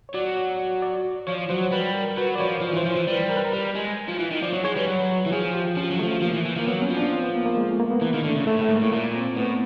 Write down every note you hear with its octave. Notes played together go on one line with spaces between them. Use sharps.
C#5
F#3 D5
D5
F3 C#5
F#3 C5
G3 B4
A#4
F#3 B4
D5
F3 C#5
F3
E3
C5
F3
C5
E3
G3 B4
A#4
B4
A#4
G3
G#3
F3
E3
D#3
F3 D5
F#3 C#5
G#3 C#5
G3 B4
F#3
E3
F3 G#4
G4
F3 C#4
F#3
A3
F3
F3 A#3
E3
E3
F3
A#3
F#3 B3
C#4
F3
D4
C4
B3
A#3
A#3
G#3
A3
A#3
B3
E3 A#3
D#3
D3 A3
C#3
A2 A3
A2
A3
G#2
A#3
A2
A#2 A#3
C4
A2 B3